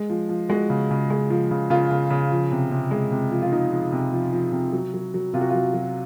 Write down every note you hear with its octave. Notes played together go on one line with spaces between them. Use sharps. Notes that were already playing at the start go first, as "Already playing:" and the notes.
Already playing: G#3
F3
F3
G#3 F#4
C#3
C#3
G#3
F3
C#3
C#3 F4
C#3
C#3
F3
C3
C3
G#3
C3
F3
F4
F3 D#4
F3
C3
F3
F3
C3
F#3
F#3
F#3
C3 F4
F#4
F#3 F4
F#3